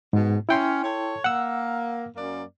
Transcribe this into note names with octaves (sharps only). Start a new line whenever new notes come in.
G#2 B2
C#4 E4 G5 C6
A4 C#5
A#3 F#5 E6
F#2 A#3 D5